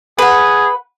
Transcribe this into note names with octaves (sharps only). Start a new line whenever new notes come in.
G#4 B4 F#5